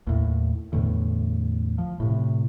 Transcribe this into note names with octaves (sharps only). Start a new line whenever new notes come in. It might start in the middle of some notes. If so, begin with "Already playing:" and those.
D#2 A2
E2 A2 D3
F3
A2 C3